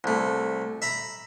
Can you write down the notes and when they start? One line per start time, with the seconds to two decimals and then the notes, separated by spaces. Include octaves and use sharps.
0.04 C2 A3
0.82 E5 A#5 B5